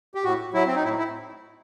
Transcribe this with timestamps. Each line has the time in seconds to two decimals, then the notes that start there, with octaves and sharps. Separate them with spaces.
0.15 G4
0.24 A2 F#4
0.54 F#3 E4
0.67 C4
0.75 D#4
0.84 A2 E4
0.98 E4